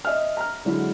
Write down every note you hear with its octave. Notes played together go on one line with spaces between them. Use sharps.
D#5 E5 F6
A#5 F6
D3 F#3 G#3 E4